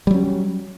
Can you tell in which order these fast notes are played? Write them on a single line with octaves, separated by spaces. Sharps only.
G3 F#3 C#4